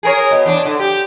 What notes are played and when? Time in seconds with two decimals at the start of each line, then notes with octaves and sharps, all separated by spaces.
0.03 G#4 A#4 C#5
0.31 B2
0.46 E2 D4
0.65 D3
0.80 G4